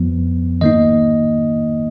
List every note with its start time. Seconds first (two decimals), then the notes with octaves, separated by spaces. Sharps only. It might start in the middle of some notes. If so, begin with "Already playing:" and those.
Already playing: F2 F3 B3
0.61 D#3 A#3 D#4 D#5